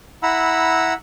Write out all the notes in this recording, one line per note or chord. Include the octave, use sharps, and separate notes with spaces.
E4 F#5 A#5 B5 E6